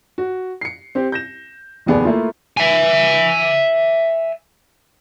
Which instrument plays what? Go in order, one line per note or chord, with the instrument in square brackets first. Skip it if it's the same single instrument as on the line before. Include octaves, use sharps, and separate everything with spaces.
[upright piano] F#4
C7 C#7
C4 G4
G6 A#6 E7
F1 D#2 B3 G#4 D5
A3 A#3 E4 F4
[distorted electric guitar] E5 G#5